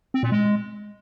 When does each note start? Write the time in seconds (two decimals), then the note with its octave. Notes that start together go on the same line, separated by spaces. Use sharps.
0.14 C4
0.23 A#2
0.32 G#3